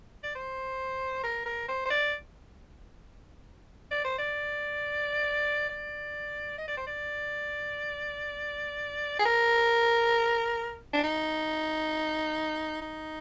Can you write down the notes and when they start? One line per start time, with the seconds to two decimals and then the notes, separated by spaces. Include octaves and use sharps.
0.23 D5
0.35 C5
1.23 A#4
1.46 A#4
1.68 C5
1.85 C5
1.90 D5
3.91 D5
4.04 C5
4.18 D5
5.69 D5
6.58 D#5
6.68 D5
6.77 C5
6.87 D5
9.19 G#4
9.25 A#4
10.93 D4
11.03 D#4
12.81 D#4